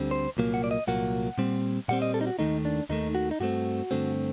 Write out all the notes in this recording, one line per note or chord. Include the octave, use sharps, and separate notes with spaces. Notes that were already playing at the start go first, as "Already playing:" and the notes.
Already playing: D2 D3 G3 C4
C5
C2 A#2 F#3 A#3
F#5
D5
D#5
C2 A#2 F#3 A#3 F#5
A#2 G3 C4
A#2 G3 C4 F#5
D#5
A4
D#4
F#4
D#2 D#3 A3 D#4
D4
D#2 D#3 A3 D#4
F#4
D#4
G2 D3 A3 C4 F#4
G2 D3 A3 C4